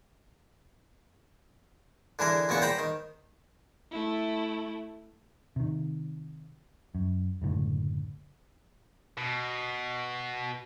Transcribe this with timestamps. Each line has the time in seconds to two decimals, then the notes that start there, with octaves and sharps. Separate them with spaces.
2.19 D3 E3 G#4 A#4
2.49 E2 A#2 C#3 B3 C#6
2.62 C5 G5 A#5 B5
2.79 D#3
3.91 A3 E4
5.56 C3 D#3
6.95 F#2
7.41 F#1 C#2 A2 D3
9.17 B2